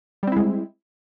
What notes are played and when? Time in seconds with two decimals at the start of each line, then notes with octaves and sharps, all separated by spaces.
0.23 G3
0.27 C4
0.32 E4
0.36 G#3